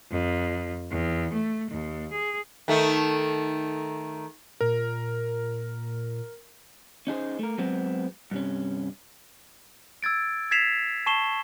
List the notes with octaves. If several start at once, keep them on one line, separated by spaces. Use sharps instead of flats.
F2
E2
A3
D#2
G#4
D#3 A3
A#2 A#4
C#4 D#4 G#4 C5
A3 A#4
F#3 G#3 B3 C4
G2 C3 C#4
E6 G#6 A6 D7
G#6 A6 B6 C7 E7 F7
A5 C#6 C7 E7 G7